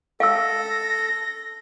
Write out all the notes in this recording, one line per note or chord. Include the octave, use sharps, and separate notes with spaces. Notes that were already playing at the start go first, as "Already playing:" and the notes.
A4 F5 E6 A#6